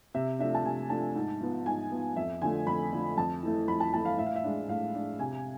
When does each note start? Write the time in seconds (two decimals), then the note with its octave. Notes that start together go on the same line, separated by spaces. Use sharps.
0.14 C3 E5
0.39 F3 A3 D4 E5
0.55 A5
0.64 C3 G#5
0.90 F3 A3 D4 A5
1.15 G#2
1.41 F3 B3
1.66 G#2 G#5
1.91 F3 B3
2.16 F2 E5
2.42 D3 F3 A3 G#5
2.66 F2 B5
2.93 D3 F3 A3
3.17 F2 A5
3.43 E3 A3 E4
3.68 F2 B5
3.80 A5
3.93 E3 A3 E4 A5
4.05 F5
4.18 A2 E5
4.26 F5
4.36 E5
4.44 G#3 D4
4.68 A2 F5
4.95 G#3 D4
5.19 C3 G#5